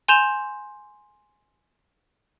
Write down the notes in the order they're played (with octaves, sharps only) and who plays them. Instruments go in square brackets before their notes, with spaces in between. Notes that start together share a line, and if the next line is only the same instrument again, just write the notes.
[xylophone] G#5 C6 G6 E7 F7